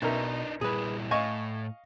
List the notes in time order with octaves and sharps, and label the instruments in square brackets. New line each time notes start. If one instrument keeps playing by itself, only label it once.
[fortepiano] B1 A#4 E5 [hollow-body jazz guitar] B2 [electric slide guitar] D4 D#4
[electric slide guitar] A#2 G3 E4 [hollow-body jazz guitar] G#4 B4
[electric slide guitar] A2 [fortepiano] D#5 F5 C#6 [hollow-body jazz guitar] G#5